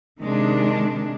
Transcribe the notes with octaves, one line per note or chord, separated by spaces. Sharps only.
C3 D#3 G#3 D4